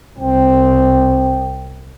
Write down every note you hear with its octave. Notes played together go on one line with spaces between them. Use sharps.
C2 C4 G5